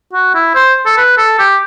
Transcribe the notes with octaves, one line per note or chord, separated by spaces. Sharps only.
F#4
E4
C5
A4
B4
A4
G4